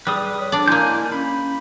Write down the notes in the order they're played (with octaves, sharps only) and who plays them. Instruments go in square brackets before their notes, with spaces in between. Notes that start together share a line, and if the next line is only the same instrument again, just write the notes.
[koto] G3 [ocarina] G#4 [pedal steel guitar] B4 D#6
[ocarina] C#5
[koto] D4 D5
[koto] G#3 A#3 [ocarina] E4 [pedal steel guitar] G#5 G6
[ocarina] C#4 [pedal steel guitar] B5